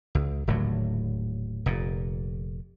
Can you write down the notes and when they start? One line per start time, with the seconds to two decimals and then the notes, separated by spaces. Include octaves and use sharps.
0.15 C#2
0.47 D#1 A2 D3 F#3
1.66 F1 A#2